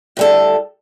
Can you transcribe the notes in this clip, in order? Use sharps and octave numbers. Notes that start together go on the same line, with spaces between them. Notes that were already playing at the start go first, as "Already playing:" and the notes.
A2 G3 A4